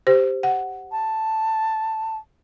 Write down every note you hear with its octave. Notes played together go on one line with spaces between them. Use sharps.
G4 C5
F#5
A5